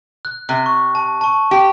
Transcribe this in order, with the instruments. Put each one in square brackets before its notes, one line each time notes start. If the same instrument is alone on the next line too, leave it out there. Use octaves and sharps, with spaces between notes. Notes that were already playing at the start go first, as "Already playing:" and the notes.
[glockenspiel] F#6
[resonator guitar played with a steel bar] C3 [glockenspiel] F#6
[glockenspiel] C#6
A5
A5 C#6
[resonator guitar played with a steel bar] G4